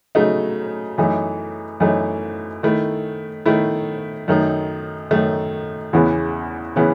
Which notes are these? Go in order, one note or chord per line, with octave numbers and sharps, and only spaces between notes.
C#3 F#3 A3 D#4
F#2 E3 A3 D#4
F#2 E3 A3 D#4
D#3 A3 E4
D#3 A3 E4
F#2 D#3 A3 D#4
F#2 D#3 A3 D#4
E2 C#3 E3 B3 E4
C#3 E3 B3 E4